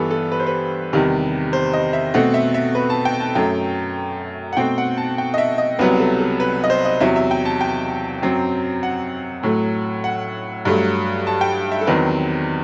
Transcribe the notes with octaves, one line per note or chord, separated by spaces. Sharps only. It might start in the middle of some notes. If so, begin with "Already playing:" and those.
Already playing: G2 E3 G3 B3 A4 B4
A4
B4
C5
B4
E2 C3 D#3 G3
C5
D#5
E5
B2 A3 C4 F#5
E5
E5
B4
A5
G5
A5
F#2 F#3 A3 G5
F#5
B2 A3 C4 G5
F#5
A5
G5
D#5
E5
D#5
C2 C3 F#3 B3 B4
A4
A4
B4
D#5
C5
D#5
E2 C3 F#3 E5
E5
G5
A5
G5
F#2 F#3 C4
F#5
A2 F#3 A3
F#5
G2 F#3 A3
A5
G5
E5
A4
E2 D#3 F#3 C4 B4